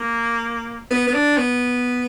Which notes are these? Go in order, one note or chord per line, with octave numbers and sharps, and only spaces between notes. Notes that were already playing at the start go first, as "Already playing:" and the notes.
Already playing: A#3
B3
B3
D4
B3